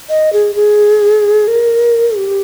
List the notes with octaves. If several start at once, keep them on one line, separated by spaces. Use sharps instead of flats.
D#5
G#4
G#4
A#4
G4